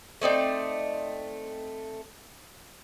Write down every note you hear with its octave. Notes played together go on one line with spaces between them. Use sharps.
A3 C4 D#4 D5